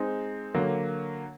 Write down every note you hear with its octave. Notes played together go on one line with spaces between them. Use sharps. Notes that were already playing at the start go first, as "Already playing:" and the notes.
Already playing: G#3 C4 D#4
D3 F#3 A#3